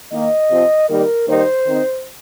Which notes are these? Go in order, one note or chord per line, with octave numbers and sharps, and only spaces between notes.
D#3 A#3 D#4 D#5
C3 F3 C4
D#3 G3 A#3 D#4 A#4
D#3 G3 A#3 D#4 C5
D#3 C4 D#4